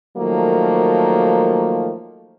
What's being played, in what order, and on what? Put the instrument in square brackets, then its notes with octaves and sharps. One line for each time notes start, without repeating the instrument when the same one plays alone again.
[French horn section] D#3 F3 F#3 A3 A#3